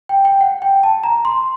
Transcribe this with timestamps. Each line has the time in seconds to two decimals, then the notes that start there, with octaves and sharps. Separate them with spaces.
0.09 G5
0.25 G5
0.41 F#5
0.62 G5
0.83 A5
1.03 A#5
1.25 C6